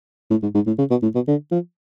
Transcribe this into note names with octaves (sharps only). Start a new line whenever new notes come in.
A2
G#2
G#2
A2
C#3
B2
A2
B2
D3
F3